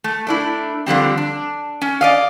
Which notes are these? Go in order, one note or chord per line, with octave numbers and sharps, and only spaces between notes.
A3
A3 D4 E4
D3 F3 G3 C4
D4
C#4
D5 D#5 F5